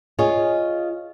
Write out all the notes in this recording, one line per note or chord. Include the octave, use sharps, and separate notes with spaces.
F4 G#4 C#5 D#5